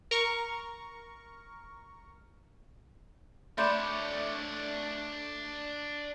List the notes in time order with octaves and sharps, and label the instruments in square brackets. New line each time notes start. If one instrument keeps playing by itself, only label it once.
[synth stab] A#4 C#6
[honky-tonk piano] A3 D5 E7 [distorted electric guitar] D4 C#5 [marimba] B5 C6 G6